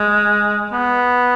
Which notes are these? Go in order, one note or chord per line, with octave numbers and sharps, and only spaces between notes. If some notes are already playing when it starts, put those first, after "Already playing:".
Already playing: G#3
B3